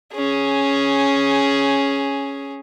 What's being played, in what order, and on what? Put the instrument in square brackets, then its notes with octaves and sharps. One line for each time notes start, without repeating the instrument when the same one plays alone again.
[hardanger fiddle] C#4 G#4